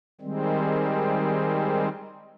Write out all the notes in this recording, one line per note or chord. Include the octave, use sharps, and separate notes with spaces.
D#3 G3 G#3 C4